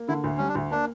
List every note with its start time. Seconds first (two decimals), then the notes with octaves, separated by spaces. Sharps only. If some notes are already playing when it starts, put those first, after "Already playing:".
Already playing: A#3
0.09 D3 E4
0.24 D2
0.38 G3 C#4
0.48 D4
0.55 D2
0.71 A#3 D4